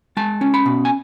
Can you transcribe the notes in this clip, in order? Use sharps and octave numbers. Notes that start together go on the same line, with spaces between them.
G#3 A5
C#4
B5
B2
G#5